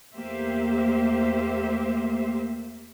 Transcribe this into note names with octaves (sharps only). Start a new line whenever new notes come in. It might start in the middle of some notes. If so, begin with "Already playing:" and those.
E2 A3 A#3 G4 C5 E5